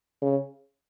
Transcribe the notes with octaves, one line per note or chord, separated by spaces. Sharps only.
C#3